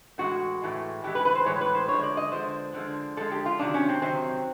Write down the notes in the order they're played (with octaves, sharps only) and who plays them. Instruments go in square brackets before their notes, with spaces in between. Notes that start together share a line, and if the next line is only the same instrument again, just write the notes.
[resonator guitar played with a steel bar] A2 E3 G#3 F#4
A2 E3 G#3
A2 E3 G#3 G4
B4
B4
C5
A2 E3 G#3 C#5
B4
C5
D3 F3 G#3 C#5
D5
D#5
D3 F3 G#3 C5
D3 F3 G#3
D3 F3 G#3 A4
G4
F4
C3 D#3 F#3 D4
C#4
C4
C3 D#3 F#3 C4